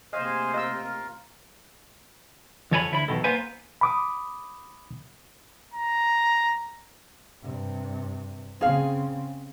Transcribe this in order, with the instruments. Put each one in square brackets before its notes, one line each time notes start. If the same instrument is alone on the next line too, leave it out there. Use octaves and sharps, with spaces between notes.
[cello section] C3 A3 A#3 [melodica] G#4 F5 G#5 [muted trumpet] C5 [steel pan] D#5
[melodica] F4 A#4 [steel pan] D#5 E6
[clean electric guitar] F2 F3 A4 C#5 G#5 B5
D2 E4 B5
B1 E2 B2 D#3 A4
A#3 B3 B4 C5 G#5
[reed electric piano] B5 D6 D#6
[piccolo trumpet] A#5
[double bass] G2 C3
[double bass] C#3 C4 [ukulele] G#4 F5